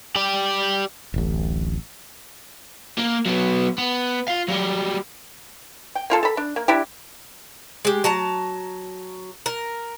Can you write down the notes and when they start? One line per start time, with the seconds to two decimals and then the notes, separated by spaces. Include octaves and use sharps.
0.16 G4 D5
1.14 D1 A1
2.99 A#3
3.26 F#3 B3
3.78 B3
4.28 F4 F5
4.48 F#3 G3
5.95 G5
6.10 A#3 F4 A4
6.23 A4 B5
6.37 D4
6.56 A#3
6.68 D4 E4 G4
7.85 G#3 G4
8.04 F#3 A5 A#5
9.46 A#4